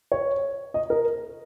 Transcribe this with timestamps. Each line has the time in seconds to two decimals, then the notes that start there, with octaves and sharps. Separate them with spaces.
0.12 C#5
0.74 D#5
0.90 A#4